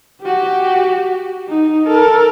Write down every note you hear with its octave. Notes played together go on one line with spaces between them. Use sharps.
F#4 G4
D#4
A4 A#4